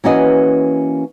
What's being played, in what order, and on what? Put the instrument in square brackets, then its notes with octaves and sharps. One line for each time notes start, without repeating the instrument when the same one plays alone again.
[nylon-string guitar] E3 A#3 C#4 F#4 B4 D#5